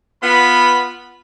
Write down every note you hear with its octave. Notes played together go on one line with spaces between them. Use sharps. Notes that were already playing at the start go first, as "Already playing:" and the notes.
B3 F4 B5